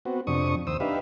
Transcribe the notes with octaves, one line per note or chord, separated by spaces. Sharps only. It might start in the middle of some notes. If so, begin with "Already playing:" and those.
B3 C4 F#4
F2 C3 D4 C#6 D#6
D#2 C5 D#6 E6
D4 D#4 G4 B4 E5 F5